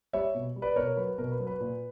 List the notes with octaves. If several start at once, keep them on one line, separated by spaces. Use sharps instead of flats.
G3 C#5 E5
B2
G3
B4 D5
B2 A#4 C#5
F#3 B4
B2 A#4
B4
F#3
B4
A#2